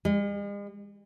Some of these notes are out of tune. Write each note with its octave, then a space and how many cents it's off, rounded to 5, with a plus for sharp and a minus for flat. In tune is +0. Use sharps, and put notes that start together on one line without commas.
G#3 -45